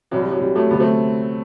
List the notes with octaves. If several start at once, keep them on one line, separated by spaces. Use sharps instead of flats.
C2 C3 E3 F#3
G3
F#3
C2 C3 E3 G3
F#3 A3
D2 C3 F#3 G3 B3
A3 C4